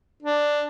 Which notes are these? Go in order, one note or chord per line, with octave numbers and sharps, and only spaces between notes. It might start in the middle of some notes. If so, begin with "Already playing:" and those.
D4